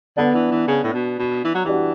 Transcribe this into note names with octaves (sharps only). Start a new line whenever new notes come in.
D3 B3 D4
E3
E3
C#3
A2
B2
B2
E3
F#3
E3 D4 F#4 G4